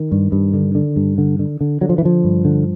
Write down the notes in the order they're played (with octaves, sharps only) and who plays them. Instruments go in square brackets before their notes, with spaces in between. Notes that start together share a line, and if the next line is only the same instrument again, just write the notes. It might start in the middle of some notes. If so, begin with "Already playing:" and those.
Already playing: [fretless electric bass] D#3
G2
G2
D3
D3
G2
D3
D3
D3
D3 F#3
F3
E3
D3 F3
G2
D3